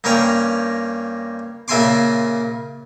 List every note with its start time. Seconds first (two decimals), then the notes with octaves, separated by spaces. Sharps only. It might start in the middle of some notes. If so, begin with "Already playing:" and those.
0.04 G2 A#3 C#4 G5 A#5
1.68 A#2 C#3 E5 G#5 C6 D6